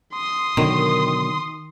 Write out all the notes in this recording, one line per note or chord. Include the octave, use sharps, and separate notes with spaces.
C6 D#6
B2 D3 D#3 F#3